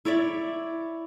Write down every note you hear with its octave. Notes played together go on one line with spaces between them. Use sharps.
E4 C#5 D5 E5